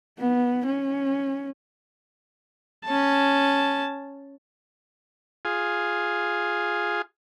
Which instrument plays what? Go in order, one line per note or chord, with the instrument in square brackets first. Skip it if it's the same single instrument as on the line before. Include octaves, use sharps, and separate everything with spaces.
[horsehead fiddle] B3
C#4
[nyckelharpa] C#4 A5
[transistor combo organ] F4 G#4